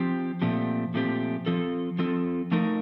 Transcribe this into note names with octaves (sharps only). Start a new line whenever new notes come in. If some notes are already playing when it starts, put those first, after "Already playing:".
Already playing: F3 C4 G4
A#2 F3 A3 C4 G4
A#2 F3 A3 C4 G4
F3 C4 F4 A4
F3 C4 F4 A4
F3 A3 D#4 A#4